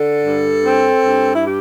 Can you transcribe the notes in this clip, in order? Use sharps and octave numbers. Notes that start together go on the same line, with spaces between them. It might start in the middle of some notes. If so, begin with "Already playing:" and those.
Already playing: D3 A4
G2
C4
G2
E4
G4